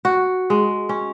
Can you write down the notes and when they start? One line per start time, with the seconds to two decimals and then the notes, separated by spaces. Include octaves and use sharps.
0.05 F#4
0.50 G#3
0.89 C#4